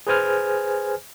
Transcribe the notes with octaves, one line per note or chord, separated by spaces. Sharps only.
G#4 B4 C5 G#5 F6